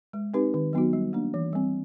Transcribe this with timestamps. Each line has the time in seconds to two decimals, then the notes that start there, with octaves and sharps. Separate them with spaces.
0.13 G#3
0.34 C4 D#4 G4 B4
0.54 D#3
0.73 F#3 B3 D#4 F#4
0.93 G3
1.13 A#3 D4
1.34 E3
1.53 G3 C4